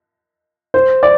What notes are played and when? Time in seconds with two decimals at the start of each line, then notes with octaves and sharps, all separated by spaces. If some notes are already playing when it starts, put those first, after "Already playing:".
0.74 C5
1.03 D5